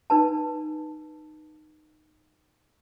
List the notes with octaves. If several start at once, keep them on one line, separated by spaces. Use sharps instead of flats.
D#4 B4 A5